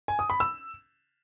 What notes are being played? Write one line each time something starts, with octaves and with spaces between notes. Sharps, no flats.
G#5
D#6
B5
E6